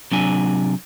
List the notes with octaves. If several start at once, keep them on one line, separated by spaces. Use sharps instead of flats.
C3 F#3 D4 G#5